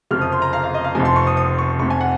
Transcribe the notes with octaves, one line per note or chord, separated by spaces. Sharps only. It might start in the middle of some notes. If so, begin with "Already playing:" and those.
F#1 F2 C3 F3 F6
D#6
C6
A#5
F5
F5
D#5
F5
F1 F2 C3 F3 G#5
C6
C#6
D#6
D#6
C#6
F1 F2 C3 C#6
G#5
F#5